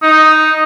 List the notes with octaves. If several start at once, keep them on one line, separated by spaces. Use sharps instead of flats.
D#4